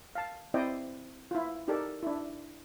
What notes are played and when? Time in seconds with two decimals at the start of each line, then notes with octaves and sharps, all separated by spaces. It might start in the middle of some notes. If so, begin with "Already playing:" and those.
0.15 F5 A5
0.54 C4 E4 C5 D5 D#5 G5
1.31 E4 F4
1.68 D#4 G4 A4 A#4 D5
2.03 D4 E4